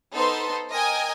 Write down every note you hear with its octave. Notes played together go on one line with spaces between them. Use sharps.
B3 D#4 A4 B4 C5 C6
A#4 D#5 G5 G#5